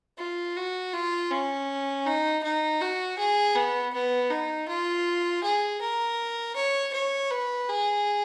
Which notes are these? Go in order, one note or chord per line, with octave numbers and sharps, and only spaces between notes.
F4
F#4
F4
C#4
D#4
D#4
F#4
G#4
B3
B3
D#4
F4
G#4
A#4
C#5
C#5
B4
G#4